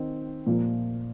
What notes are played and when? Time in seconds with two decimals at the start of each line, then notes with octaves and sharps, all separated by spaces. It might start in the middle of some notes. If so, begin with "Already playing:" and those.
Already playing: D#3 C4
0.47 A#2 F3 A#3